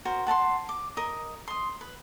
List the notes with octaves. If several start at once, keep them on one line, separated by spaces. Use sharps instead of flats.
F#4 A#4 C5
F#5 A5 A#5 C6
D6
A#4 D#5
C6 D#6
B4